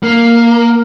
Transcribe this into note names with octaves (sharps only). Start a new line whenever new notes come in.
A#3